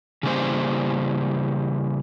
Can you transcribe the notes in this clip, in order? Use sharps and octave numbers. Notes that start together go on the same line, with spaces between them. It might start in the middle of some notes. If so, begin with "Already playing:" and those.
C#3 E3 G3 A#3 C#4 C5